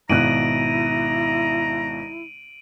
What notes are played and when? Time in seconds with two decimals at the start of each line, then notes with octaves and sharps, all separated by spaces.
0.09 G#1 B2 E4 A#5 F#6 D7 D#7 F#7